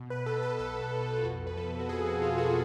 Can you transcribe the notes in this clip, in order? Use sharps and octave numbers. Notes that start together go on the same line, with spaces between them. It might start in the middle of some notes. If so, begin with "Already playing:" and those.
Already playing: B2
B4
B2 A4
B4
B4
B1 A4
B2
F4
F2 F#4
B4
F3 A4
F#4
F2 G#4
F#4
F2 F4
F#4